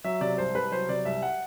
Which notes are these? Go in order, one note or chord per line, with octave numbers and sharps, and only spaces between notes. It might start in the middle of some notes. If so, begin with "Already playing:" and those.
F#3 E5
C3 D5
C2 C5
C2 B4
F#3 C5
C3 D5
C2 E5
F#5